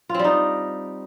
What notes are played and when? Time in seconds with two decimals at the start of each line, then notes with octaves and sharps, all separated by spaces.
0.09 F4
0.14 C4
0.19 G3
0.24 D#4